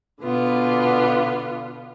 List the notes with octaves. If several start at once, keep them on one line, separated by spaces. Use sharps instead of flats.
B2 D3 B3 F4